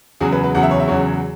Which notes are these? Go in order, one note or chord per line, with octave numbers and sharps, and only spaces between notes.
E2 C#3 F#3 G#4
B4
B4
E2 C#3 F#3 F#5
E5
C#5
E5
E2 C#3 F#3 C#5